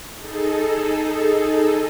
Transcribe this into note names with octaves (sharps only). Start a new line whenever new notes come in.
D#4 G#4 A4